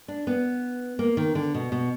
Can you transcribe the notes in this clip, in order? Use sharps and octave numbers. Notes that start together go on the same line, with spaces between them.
D4
B3
A#3
D#3
D3
B2
B2